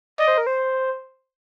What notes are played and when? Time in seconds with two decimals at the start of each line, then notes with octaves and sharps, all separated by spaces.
0.18 D5 D#5
0.28 C5
0.38 A#4
0.47 C5